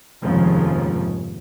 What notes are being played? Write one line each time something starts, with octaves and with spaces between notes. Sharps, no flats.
F1 D#2 G#2 C#3 F3